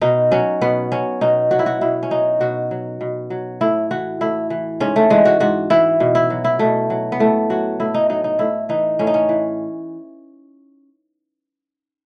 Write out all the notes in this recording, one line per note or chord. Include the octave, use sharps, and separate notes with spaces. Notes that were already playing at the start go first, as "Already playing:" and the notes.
B2 D#4
F#3 C#4
B2 B3
F#3 C#4
B2 D#4
F#3 F#4
E4
F#4
B2 E4
C#4
F#3 D#4
B2 F#4
F#3
B2
F#3
A2 E4
E3 F#4
A2 E4
E3
G#2 C#4
A3
E3 G#3
F#4
G#2 F#4
E3 E4
B2
E4
F#3
E4
B2 A3
F#3
B3
A2 A3
F#3 F#4
A2 E4
D#4
F#3 D#4
D#4
A2 E4
E3 D#4
A2 C#4
D#4
C#4
E3